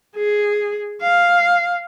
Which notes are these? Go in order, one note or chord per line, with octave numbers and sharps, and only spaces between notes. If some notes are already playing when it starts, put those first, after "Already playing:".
G#4
F5